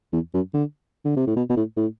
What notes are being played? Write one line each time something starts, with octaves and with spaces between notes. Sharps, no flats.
E2
F#2
D3
D3
C3
A2
B2
B2
A2
A2